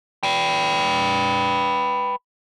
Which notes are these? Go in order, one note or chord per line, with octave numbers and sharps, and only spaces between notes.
B4 G5